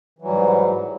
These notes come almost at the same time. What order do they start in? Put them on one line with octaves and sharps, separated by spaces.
E3 F#3 G3 G#2